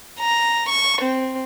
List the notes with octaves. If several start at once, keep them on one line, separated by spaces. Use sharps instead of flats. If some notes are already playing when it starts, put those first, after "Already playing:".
A#5
C#6
C4